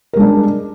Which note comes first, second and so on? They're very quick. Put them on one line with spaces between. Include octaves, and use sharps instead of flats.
A#4 G#3 D4